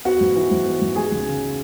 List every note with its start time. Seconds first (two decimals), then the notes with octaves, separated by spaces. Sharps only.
0.05 B3 F#4 F#5
0.21 G#2
0.36 E3
0.51 G#2
0.66 B3
0.81 G#2
0.96 G#3 G#4 G#5
1.11 C#2
1.27 C#3